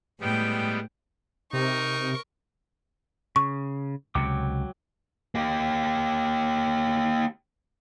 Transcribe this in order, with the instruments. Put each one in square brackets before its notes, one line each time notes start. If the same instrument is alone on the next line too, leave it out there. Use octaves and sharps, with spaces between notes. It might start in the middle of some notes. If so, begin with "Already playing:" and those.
[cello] A2 G5 [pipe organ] G3 G#3 B3
[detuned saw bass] C3 [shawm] D#4 [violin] A#4 C#6
[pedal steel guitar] C#3 [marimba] C#6
[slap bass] C#2 C3 [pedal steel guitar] F#3 G5 D6
[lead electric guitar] A#3 G4